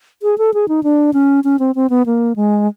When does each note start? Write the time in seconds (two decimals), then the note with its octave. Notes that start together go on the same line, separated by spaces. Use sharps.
0.23 G#4
0.38 A4
0.54 G#4
0.68 D#4
0.83 D4
1.14 C#4
1.44 C#4
1.59 C4
1.75 C4
1.90 B3
2.06 A#3
2.36 G#3